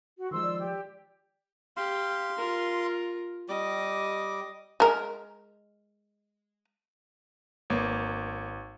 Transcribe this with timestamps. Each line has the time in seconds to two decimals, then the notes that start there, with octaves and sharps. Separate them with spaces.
0.18 F#4
0.31 D#3 F3 G#3 C6 E6
0.43 D5
0.58 G4
1.77 G4 F5 C6
2.38 F4 A#4
3.49 G3 D#5 D6
4.80 G#3 A#4
7.70 G#1 A#3 B3 C#5